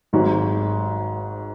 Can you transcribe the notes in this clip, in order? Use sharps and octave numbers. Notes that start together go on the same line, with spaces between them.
G#1 G#2 F#3